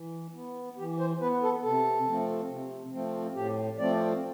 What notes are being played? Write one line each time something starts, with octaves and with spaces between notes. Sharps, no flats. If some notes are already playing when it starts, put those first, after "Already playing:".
Already playing: E3
B3
E3 G4
C5
B3 B4
A4
C3 A4
F3 A3 C4
C3
F3 A3 C4
A2 G4
F3 A3 C4 D5